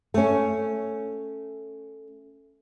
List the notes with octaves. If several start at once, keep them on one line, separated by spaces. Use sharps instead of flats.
A3 C#4